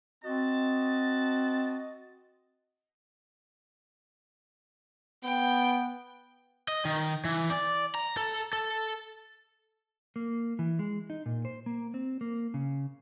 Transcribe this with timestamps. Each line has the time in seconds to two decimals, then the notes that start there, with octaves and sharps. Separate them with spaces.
0.24 C4 F#4 D#5 A5
5.24 B3 G5
6.68 D#5
6.85 D#3
7.25 E3
7.50 D5
7.95 A#5
8.17 A4
8.53 A4
10.16 A#3
10.59 E3
10.79 G#3
11.10 D#4
11.26 A#2
11.45 C5
11.66 A#3
11.94 C4
12.21 A#3
12.54 C#3